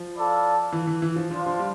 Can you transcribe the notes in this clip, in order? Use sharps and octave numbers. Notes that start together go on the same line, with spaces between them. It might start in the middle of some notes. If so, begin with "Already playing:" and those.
Already playing: F3
E4 A4 D5 F5
E3
E3
E3
F3
F3 D4 F4 C5 F5
F3
G3